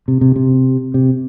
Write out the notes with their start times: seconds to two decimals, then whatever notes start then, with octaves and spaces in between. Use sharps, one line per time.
0.08 C3
0.21 C3
0.36 C3
0.94 C3